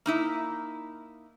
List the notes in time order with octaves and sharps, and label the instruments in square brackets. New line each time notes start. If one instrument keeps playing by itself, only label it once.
[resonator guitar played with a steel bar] A#3 D#4 E4